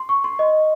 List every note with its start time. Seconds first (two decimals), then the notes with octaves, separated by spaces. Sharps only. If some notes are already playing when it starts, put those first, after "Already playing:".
Already playing: C6
0.09 C#6
0.24 C6
0.39 D#5